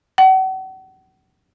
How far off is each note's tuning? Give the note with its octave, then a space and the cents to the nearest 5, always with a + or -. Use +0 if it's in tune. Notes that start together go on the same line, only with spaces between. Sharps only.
F#5 +40